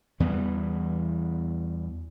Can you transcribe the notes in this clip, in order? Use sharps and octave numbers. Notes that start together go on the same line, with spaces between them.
E2 E3 G3 B3